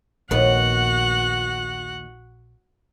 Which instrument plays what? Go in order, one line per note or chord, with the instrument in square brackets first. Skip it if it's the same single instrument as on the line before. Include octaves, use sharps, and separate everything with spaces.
[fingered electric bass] A#1 A#2 [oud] D#2 B3 [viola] F#4 F#5